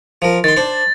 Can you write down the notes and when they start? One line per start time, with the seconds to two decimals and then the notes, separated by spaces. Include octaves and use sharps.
0.22 F3 A#4
0.44 D#3 C6 A6
0.57 D4 C5